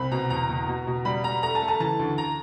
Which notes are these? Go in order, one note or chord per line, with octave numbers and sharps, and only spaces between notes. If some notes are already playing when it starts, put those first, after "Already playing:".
Already playing: C2 C4 B5
B2 A#5
E2 A#5
E2
B2
B2
G3 B5
G3 A#5
A3 A#5
A5
A3
A5
E3 A5
D2
A#5